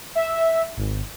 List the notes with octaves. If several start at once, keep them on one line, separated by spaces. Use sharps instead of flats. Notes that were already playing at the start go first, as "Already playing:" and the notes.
E5
G#1